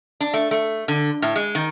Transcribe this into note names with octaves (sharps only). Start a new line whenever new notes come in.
D4
A3
A3
D3
A2
G#3
D#3